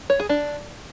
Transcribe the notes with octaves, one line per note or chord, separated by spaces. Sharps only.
C#5
G#4
D4